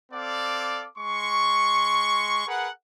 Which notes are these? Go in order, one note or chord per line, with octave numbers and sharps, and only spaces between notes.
C4 A4 D5 F5 D6
G#3 C6 C#6
G#4 A#4 B4 F#5